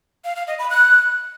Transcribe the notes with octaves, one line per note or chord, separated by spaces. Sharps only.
F5
F5
D#5
B5
F#6